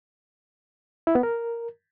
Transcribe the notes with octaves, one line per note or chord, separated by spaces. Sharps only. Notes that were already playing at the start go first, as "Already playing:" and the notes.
E4
B3
A#4